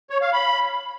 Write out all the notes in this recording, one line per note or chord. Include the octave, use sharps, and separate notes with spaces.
C#5
F5
B5